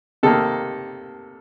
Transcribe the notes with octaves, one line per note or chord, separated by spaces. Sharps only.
C3 D#3 A#3 A4